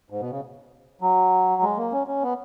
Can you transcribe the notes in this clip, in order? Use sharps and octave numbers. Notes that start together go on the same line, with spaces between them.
G#2
B2
C#3
F#3
G#3
A#3
C#4
C#4
B3